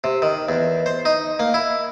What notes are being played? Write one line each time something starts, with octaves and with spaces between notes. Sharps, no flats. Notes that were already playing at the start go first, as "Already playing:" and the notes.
C3
D#3
E2
C5
D#4
A#3
E4